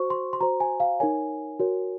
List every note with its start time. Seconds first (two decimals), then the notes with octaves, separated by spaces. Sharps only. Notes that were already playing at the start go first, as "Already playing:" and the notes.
Already playing: F#4 C5 C#6
0.10 C6
0.33 C6
0.41 F#4 C5 A#5
0.60 G#5
0.80 F5
1.00 D#4 A#4 C#5 G#5
1.60 F#4 A#4 C#5